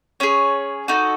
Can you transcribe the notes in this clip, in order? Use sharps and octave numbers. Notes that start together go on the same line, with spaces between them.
C#4 G#4 C#5
D#4 F#4 A4